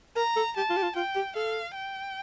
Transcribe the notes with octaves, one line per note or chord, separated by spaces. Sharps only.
A#4 A#5
A4
G4 A5
F4
G4
F4
F4 G5
G4
A4 F5
G5